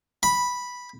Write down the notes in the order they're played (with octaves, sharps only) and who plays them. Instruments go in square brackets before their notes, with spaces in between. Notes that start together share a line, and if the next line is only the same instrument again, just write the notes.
[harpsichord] B5